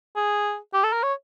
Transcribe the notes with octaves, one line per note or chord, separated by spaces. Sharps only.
G#4
G4
A4
A#4
C#5